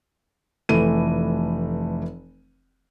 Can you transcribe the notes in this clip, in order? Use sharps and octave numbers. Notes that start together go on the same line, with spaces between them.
F1 E3 A3 B4 D#7